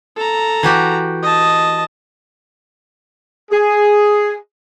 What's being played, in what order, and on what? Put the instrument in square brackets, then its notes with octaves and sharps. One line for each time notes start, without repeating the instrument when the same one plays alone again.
[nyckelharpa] A4 A#5
[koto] E3 F#4 G4
[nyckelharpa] D#5 A5
[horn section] G#4